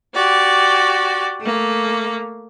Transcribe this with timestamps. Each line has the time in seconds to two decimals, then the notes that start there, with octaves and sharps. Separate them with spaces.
0.14 F#4 G4 D5
1.40 A3 A#3